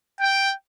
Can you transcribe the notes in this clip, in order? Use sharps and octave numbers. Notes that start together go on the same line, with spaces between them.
G5